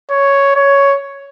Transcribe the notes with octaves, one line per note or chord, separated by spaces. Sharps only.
C#5
C#5